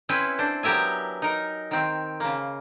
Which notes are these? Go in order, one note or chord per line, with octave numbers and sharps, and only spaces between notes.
C4 C#4 E4 B4 C5
D4 C5
F#3 B3 G4 A#4 E5 G#5
D#4 A#4
D#3 C4
C#3 A#3